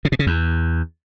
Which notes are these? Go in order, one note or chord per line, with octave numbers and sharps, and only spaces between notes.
C#3
B2
C#3
E2